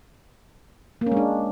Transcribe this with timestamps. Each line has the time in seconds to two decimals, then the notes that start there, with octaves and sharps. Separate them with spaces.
1.01 A#3
1.06 C#4
1.12 G#3
1.17 D4